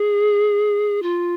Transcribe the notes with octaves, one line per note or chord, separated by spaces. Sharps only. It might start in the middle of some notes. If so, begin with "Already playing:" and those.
Already playing: G#4
F4